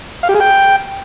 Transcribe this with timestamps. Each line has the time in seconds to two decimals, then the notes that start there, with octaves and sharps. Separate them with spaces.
0.23 F5
0.29 G4
0.35 G#4
0.40 G5